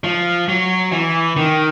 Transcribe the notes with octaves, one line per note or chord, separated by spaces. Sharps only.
F3
F#3
E3
D#3